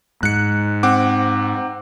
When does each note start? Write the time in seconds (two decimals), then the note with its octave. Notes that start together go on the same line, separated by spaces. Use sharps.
0.23 G#2 F#6 C#7
0.83 C4 F#5 D6